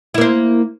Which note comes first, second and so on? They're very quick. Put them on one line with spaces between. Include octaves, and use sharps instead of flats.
E4 A#3 C5